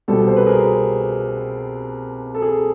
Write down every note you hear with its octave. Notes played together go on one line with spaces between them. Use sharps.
C2 B2 G3 C4 A4
C5
B4
G#4 A#4
A4
G#4